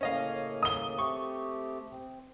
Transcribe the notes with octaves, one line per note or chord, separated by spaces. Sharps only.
A2 C#3 A#3 C#4 D#5 F5
D#6 G7
A3 C4 G4 C#6
C4